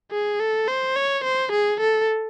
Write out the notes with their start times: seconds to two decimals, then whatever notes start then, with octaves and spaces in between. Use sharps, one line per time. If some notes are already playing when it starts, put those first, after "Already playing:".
0.11 G#4
0.40 A4
0.68 C5
0.96 C#5
1.24 C5
1.52 G#4
1.80 A4